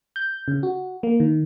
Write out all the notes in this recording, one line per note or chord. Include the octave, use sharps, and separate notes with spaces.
G6
C#3
F#4
A#3
D#3